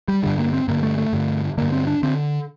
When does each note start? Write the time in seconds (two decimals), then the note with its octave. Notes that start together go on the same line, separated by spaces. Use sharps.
0.08 G3
0.23 G2 D3 G3
0.39 A#3
0.53 C4
0.68 G2 D3 A#3
0.83 A3
0.98 A3
1.13 G2 D3
1.57 G2 D3 A#3
1.72 C4
1.87 D4
2.03 D3 C4